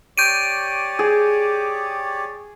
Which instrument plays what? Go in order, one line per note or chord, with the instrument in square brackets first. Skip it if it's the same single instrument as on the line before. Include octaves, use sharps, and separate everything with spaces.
[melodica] G4 C#5 D5 [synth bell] G6 D7 D#7
[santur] G#4